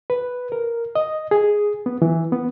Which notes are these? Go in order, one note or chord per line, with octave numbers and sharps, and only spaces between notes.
B4
A#4
D#5
G#4
B3
E3
B3